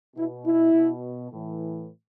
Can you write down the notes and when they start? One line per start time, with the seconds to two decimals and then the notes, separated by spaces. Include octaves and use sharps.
0.16 B2 E4
0.46 E4
0.74 B2
1.32 A2 E3